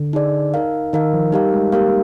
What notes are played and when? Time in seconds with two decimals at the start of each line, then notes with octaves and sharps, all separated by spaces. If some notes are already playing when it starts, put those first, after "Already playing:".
Already playing: D3
0.13 D#4 G#4 D5
0.54 D#4 A#4 F5
0.93 D#3 D#4 A#4 F5
1.13 F3
1.32 G3 D#4 G4 A#4 F5
1.53 G#3
1.72 A#3 D#4 G4 A#4 F5